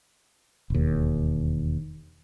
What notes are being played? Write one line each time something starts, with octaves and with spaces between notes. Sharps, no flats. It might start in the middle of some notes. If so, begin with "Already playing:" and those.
E1 D#2